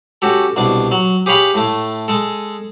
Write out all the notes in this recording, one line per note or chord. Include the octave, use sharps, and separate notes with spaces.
C#4 F#4 G4 A4
C2 B2 D4
F#3
G4 G#4 C#5 F5 B5 C#6
A2 A3
G#3 A4